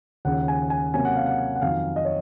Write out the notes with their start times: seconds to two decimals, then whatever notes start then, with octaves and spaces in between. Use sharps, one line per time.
0.25 D#2 C#3 F3 F#5
0.48 G#5
0.70 G#5
0.94 C3 F#3 A#3 C#4 G#5
1.05 F#5
1.16 F5
1.27 F#5
1.55 F#5
1.62 F2 D#3 F#3 F5
1.96 D#5
2.05 C#5